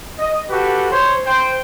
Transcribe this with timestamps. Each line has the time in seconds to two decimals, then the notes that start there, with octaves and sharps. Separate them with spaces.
0.19 D#5
0.50 F#4 G4 A4 B4
0.91 C5 C#5
1.25 C5 G5